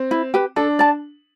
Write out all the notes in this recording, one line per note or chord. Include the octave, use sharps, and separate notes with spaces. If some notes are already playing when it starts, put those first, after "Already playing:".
Already playing: C4
E4
G4 B4
D4 A4
D5 A5